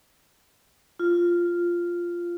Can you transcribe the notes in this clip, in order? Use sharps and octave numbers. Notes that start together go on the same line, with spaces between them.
F4